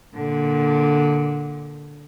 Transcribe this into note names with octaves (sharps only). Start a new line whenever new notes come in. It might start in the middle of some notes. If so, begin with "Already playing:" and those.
A#2 D3